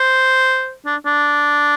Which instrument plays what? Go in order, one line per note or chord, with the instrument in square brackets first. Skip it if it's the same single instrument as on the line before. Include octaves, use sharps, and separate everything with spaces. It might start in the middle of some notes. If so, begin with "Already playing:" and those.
Already playing: [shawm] C5
D4
D4